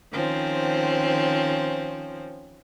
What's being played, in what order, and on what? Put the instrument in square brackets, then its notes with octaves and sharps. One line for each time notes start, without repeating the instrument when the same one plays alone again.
[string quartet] D#3 F3 C4 C#4